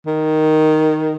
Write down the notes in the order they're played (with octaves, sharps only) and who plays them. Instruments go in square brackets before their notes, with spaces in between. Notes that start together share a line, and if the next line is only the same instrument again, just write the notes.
[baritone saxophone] D#3